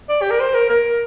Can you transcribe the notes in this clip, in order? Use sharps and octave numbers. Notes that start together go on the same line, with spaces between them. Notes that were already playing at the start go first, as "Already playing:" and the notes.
D5
G4
A#4
C5
A#4
A#4